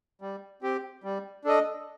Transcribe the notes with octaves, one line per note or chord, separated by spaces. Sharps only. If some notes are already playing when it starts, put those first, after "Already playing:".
G3
C4 G4
G3
D4 A4 D#5